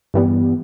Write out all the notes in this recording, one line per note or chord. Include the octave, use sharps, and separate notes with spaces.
G2 E3 G3 B3